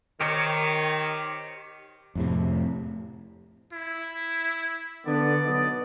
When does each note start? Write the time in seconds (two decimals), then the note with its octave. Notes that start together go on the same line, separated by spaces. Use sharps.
0.21 D#3 G4 C5 C#5
2.15 F2 A2 C3
3.73 E4
5.06 D3 B3 D5
5.45 B1 B4 D#5